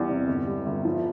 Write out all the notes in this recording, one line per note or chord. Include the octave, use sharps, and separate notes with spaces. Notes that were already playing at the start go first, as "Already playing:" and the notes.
Already playing: E2 G3
C3
G1
G3
G1
F3